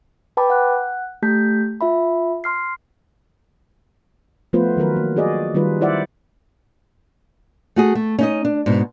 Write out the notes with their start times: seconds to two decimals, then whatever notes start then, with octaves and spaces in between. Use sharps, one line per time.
0.37 B4 G5 A5 B5 D6
0.50 F#5 F#6
1.22 A3 G4 A5 G6 B6
1.81 F4 E5 B5
2.44 C6 F6 C7
4.53 F3 A3 B3 F4 B4 C5
4.77 D#3 F#3 A#4 B4
4.96 A#3
5.16 F#4 G#4 D5 D#5
5.54 D#3 G3 D#4 F4 B4
5.81 E4 C5 D5 E5 F#5
7.76 A3 F#4 G#4
7.95 A3
8.19 C#4 D#4 D#5
8.45 D4
8.66 G#2 B2